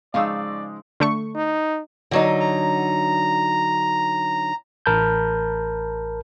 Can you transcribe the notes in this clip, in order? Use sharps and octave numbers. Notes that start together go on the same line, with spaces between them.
C#3 F3 G#3 D#4 D5 F5 C#6 E6
D3 A3 C#6
D#4
D3 F#3 D#4
A#5
A1 A#4 A5 B5 G6